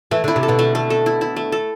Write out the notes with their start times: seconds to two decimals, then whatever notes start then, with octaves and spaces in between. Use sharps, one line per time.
0.11 E3 A3
0.24 D3 E4
0.36 C3
0.43 A4
0.48 B2 D3
0.59 A3
0.75 A3
0.90 A4
1.06 E4
1.21 E4
1.36 A3
1.52 A4